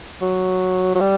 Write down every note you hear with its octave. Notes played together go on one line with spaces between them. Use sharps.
F#3
F#3
G3